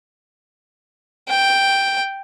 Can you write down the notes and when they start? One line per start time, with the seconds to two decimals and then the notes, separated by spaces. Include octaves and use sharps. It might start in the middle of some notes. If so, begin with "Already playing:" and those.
1.29 G5